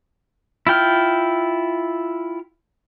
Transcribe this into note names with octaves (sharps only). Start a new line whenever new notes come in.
E4 F4 G5 F6